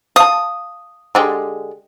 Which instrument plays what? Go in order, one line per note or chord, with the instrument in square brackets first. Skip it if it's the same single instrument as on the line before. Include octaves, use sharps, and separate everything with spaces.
[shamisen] F5 A5 [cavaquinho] D#6
[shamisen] D3 G#3 G4